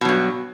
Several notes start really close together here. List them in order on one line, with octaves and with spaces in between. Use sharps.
B2 F#3 G2